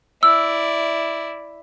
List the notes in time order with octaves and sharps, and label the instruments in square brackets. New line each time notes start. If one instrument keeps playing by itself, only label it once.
[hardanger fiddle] E4 D5 [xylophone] E6